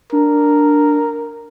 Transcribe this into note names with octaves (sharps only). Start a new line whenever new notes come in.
D4 A#4